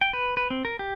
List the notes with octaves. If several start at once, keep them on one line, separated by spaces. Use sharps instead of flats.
G5
B4
B4
C4
A#4
G4